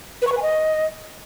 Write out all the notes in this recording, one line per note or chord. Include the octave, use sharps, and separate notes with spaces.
B4
C#6
B4
G#5
D#5